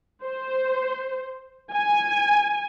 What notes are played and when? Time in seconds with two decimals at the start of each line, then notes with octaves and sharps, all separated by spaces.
0.23 C5
1.73 G#5